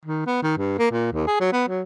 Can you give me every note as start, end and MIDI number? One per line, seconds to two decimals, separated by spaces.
0.06 0.24 51
0.27 0.41 59
0.43 0.57 51
0.58 0.76 43
0.79 0.87 58
0.91 1.12 46
1.13 1.25 39
1.27 1.39 68
1.40 1.49 54
1.53 1.66 59
1.68 1.82 54